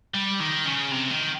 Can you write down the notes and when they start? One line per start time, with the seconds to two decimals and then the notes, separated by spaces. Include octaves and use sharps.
0.14 G3
0.40 D#3
0.65 C#3
0.91 C3
1.11 D#3